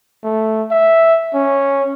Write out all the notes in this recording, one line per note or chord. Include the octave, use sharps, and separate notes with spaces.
A3
E5
C#4